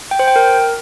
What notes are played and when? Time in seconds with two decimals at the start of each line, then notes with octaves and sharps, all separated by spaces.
0.11 G5
0.19 C5
0.28 G5
0.36 A#4